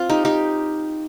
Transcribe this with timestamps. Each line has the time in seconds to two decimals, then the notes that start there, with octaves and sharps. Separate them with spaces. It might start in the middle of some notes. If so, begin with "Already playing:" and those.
Already playing: C4 F4
0.09 D#4 G4
0.25 D#4 G4